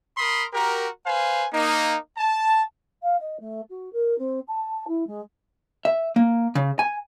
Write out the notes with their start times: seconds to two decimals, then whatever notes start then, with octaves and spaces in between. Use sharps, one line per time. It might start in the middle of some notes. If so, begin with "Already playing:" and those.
0.17 A#4 B5 C6 D#6
0.52 F#4 G4 A#4
1.06 B4 C5 F5 G#5
1.52 A#3 D#4
2.17 A5
3.02 F5
3.20 D#5
3.40 A3
3.70 F#4
3.92 A#4
4.18 C4
4.48 A5
4.87 E4
5.07 G#3
5.85 E5
6.16 A#3
6.55 C#3
6.79 G#5